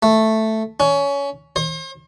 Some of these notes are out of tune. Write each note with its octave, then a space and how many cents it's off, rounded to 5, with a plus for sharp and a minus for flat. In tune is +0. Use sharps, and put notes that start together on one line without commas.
A3 +0
C#4 +20
C5 +40